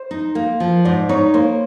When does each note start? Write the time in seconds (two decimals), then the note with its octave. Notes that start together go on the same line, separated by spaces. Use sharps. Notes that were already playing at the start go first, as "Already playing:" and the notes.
Already playing: C5
0.11 D#4
0.35 A#3
0.60 F3
0.85 G#2 D5
1.09 D#4 C#5
1.34 A#3 C5